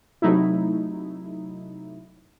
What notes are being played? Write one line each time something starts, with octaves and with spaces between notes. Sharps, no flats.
C3 F#3 A3 D#4 E4